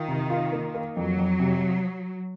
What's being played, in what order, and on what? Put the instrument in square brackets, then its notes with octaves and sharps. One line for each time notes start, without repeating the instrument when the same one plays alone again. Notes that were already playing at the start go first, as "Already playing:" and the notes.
Already playing: [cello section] D#3 [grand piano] F4
[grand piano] C3
F4
A#3
A#3
[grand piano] F2 [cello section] F#3
[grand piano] F2
C3